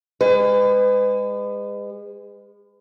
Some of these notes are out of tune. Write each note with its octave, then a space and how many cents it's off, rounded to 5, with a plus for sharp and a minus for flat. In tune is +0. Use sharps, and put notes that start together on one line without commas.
G#3 -30 B4 +35